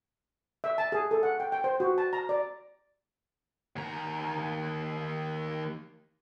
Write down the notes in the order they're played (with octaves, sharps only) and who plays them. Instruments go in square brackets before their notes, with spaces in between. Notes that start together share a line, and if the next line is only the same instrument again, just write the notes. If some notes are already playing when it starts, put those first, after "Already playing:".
[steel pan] E5
A5
G#4
A4
F#5
G5
G5
C5
F#4
A5
A#5
D5
[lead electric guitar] D#2 A#5